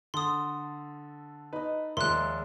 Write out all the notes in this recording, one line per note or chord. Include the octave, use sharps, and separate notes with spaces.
D3 A4 C6 D#6
D#4 B4 D#5
D#2 F3 G#3 A#4 D5 E5 C6 F#6